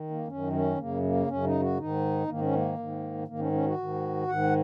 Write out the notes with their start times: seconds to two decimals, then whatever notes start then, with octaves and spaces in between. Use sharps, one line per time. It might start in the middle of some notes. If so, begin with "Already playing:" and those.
Already playing: D#3
0.10 A#3
0.28 F#2 D#3 C#4
0.53 C#4
0.78 F#2 C#3 A#3
1.03 A#3
1.27 F#2 C#3 C#4
1.44 D#4
1.60 F#4
1.78 G#2 D#3 D#4
2.27 G#2 D#3 A#3
2.41 C#4
2.53 A#3
2.78 G#2 D#3
3.27 G#2 D#3 A#3
3.39 C#4
3.52 C#4
3.65 F#4
3.77 G#2 D#3
4.27 G#2 D#3 F#5